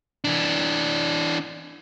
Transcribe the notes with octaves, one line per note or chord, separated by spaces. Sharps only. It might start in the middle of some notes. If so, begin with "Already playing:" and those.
E3 D4